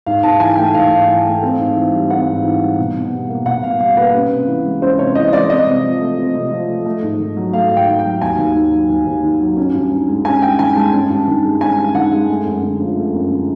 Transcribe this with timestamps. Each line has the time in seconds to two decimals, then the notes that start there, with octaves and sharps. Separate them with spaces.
0.06 G#2 F5
0.23 G#2 A5
0.40 E3 G#5
0.57 A3 G5
0.74 G#2 F5
0.91 G#2
1.08 E3
1.25 A3
1.43 C4
1.59 G#2
1.76 E3
1.93 G3
2.10 C4 F#5
2.28 G#2
2.44 E3
2.61 G3
2.78 B2
2.95 B2
3.13 G3
3.29 A#3
3.46 B2 F#5
3.63 B2 F5
3.80 G3 F5
3.97 A#3 B4
4.14 C#4
4.31 C3
4.48 E3
4.65 G#3
4.82 C#4 C5
4.98 C3 C#5
5.15 E3 D#5
5.33 G#3 D5
5.49 C4 D#5
5.67 C3
5.84 F3
6.01 A3
6.18 C4
6.35 C3
6.52 F3
6.68 A3
6.86 A3
7.03 G#2
7.20 D#3
7.37 F#3
7.53 A3 F5
7.70 G#2
7.77 G5
7.88 D#3
7.99 G5
8.05 F#3
8.22 D#2 G#5
8.38 D#2
8.55 D#3
8.73 F#3
8.89 D#2
9.07 D#2
9.23 D#3
9.40 F#3
9.57 C#4
9.74 G2
9.91 D#3
10.08 G#3
10.25 C#4 G#5
10.42 G2 G5
10.59 D#3 G#5
10.76 G#3 A5
10.93 C#4
11.10 G2
11.27 D#3
11.44 G#3
11.61 C#4 G#5
11.78 G2
11.95 D#3 F#5
12.12 G#3
12.29 A3
12.46 F#2
12.63 D3
12.80 F3
12.97 A3
13.14 F#2
13.31 D3